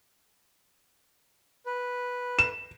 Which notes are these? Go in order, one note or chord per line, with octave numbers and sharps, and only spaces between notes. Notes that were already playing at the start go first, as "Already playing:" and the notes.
B4
E7